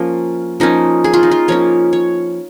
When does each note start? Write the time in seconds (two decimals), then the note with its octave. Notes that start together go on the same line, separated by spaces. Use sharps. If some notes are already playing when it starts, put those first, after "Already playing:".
Already playing: F3 A#3 C#4 F4
0.60 F3 A#3 C#4 D#4
1.04 G#4
1.13 F4
1.23 D#4
1.31 F4
1.48 F3 A#3 C#4 C#5
1.93 C#5